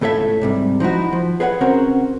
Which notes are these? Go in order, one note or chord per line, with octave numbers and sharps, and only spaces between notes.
C#2 A2 A4 C#5 E5
G#2 C3 G3
F3 D#4 E4 F#4
F3
G#4 B4 C#5 F5 F#5
C#3 C4 C#4 F#4 A#4 C5